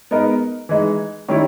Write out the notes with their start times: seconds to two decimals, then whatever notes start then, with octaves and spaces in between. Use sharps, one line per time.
0.11 G#3 B3 D#4 A#4
0.69 E3 G#3 D#4
1.28 D#3 G3 C#4 E4